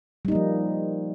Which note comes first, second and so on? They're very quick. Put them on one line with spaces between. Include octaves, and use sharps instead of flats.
G3 D#4 A#3 F3